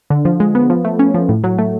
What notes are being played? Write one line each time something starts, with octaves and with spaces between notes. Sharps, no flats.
D3
F3
G#3
B3
F3
A3
C#4
F3
A2
F#3
A3